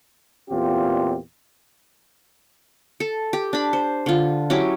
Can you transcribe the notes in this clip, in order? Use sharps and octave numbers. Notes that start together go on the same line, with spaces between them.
E2 A#2 C4 F4 G4
A4
G4
D4 B5
C5
D3 F4
F#3 C#4 E4 G4